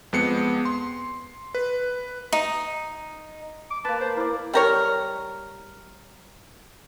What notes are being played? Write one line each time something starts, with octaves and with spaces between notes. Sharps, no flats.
F2 G#3 B3 C7 C#7
C6
B4
D#4
D6
A#3 B4 A5
C5
E4 A#4 D5
G3 A#4 C#5